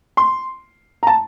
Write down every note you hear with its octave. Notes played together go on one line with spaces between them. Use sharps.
C6
A#5
A5